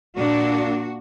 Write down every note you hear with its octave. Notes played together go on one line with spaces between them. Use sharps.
A#2 A#3 D4 F#4